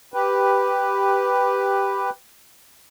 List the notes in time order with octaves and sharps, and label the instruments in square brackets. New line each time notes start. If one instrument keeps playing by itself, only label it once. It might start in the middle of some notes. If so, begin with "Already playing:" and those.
[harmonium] G4 B4